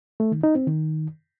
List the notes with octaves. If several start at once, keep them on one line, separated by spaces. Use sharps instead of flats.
A3
D#3
D#4
C4
D#3